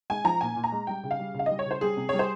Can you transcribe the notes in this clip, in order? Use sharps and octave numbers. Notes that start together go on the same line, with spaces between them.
G#3 G#5
F3 A#5
A#2 G#5
A#2
A#5
G#3
G3 G5
C#3
F5
G3
C#3 F5
G3 D#5
C#5
C#3
C5
G3 G#4
C3
G3 C#5
C5